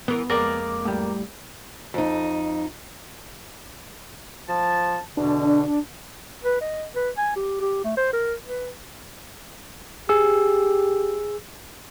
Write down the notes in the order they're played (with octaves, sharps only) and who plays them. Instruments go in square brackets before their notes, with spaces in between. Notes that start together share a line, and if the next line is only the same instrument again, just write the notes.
[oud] E3 A#4 [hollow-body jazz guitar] B3
[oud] F2 G#3 A#3 [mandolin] A#4 D5
[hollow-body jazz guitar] A2 G3
[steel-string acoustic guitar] F2 D#4
[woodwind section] F3 A5
[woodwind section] E2 B2 D3 [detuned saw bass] D4
[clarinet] B4
D#5
B4
G#5
G4
G4
A3
C5
A#4
B4
[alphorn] G4 [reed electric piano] G#4 E6